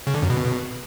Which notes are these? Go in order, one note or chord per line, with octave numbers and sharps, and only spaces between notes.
C#3
D3
F#2
B2